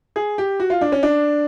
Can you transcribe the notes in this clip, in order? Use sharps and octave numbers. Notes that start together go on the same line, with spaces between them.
G#4
G4
F#4
F4
D4
C#4
D4